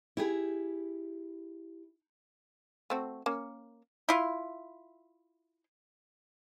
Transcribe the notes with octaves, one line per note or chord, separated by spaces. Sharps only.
E4 G4 G#4
A3 C4 F#4
A#3 C#4
E4 F4